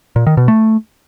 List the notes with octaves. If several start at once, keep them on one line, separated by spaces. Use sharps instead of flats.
A#2
D#3
B2
A3